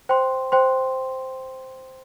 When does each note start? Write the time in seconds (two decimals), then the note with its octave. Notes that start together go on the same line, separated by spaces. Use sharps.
0.09 C5 G5 C6
0.52 C5 G5 C6